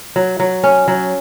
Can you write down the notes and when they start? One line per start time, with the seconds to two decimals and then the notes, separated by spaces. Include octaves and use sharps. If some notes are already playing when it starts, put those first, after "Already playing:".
0.16 F#3
0.40 F#3
0.64 C#4
0.88 F#3